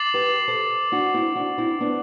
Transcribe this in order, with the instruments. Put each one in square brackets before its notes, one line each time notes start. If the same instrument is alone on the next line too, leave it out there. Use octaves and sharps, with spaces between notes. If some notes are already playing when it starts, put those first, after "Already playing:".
Already playing: [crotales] D6 A6 C7 F#7
[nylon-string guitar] G4 B4
A4 C5
D4 F#4
C4 E4
D4 F#4
C4 E4
B3 D4